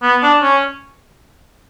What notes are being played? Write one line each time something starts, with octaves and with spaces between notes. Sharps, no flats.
B3
D4
C#4